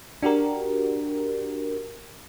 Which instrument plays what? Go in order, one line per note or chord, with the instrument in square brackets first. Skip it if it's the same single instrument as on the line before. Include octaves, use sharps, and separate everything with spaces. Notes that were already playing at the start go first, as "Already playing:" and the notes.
[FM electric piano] D4 F#4 G4 A#4